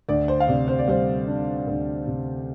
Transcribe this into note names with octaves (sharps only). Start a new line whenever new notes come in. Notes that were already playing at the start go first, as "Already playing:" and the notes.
D2 D5
C5
F5
C3 D5
C5
D5
G3 C5
D4
D2
C3